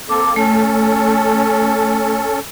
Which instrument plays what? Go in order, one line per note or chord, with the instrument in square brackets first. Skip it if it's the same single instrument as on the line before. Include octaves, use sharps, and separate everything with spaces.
[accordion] A#3 C4 A4 [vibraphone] D6
[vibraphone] A3 [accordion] C#4 A4